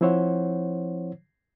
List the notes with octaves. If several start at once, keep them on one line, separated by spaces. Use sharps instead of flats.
F3 C4 E4 C5 C#5 F#5